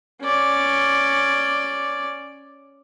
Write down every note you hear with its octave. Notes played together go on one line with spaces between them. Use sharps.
C#4 D5